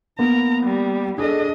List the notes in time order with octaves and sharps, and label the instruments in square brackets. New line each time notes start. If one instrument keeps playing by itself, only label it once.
[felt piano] A#3 B3 [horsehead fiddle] A#5
[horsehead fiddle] G3
[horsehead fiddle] D4 D#5 [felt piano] G#4 A4